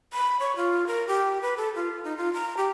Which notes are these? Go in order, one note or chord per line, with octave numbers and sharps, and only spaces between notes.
B5
C#5
F4
A#4
G4
B4
A4
F4
D#4
F4
A#5
G4